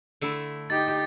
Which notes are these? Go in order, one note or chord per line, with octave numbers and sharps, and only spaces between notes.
D3 A3 E4
D#4 G4 A6